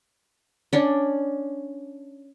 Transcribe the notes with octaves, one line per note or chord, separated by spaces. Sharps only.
C#4 D4